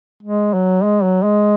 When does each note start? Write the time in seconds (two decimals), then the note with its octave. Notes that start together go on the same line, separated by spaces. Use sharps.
0.23 G#3
0.54 F#3
0.83 G#3
1.03 F#3
1.23 G#3